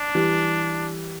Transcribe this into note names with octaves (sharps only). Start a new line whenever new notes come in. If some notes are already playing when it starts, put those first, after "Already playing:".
Already playing: D4
E3 G3